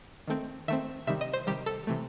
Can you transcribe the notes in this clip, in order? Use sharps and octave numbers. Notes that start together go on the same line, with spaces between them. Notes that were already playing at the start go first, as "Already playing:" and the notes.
D#3 A3 C4
D#3 A3 C4 E5
C3 D#3 G3 E5
D#5
C5
C3 D#3 G3 G4
A4
C3 E3 A3